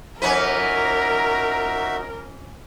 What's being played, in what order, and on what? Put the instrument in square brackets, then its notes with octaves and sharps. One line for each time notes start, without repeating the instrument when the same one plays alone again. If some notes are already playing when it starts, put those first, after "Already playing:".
[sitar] F2 C#4 B4 [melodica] D#4 F#4 E5 [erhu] A#4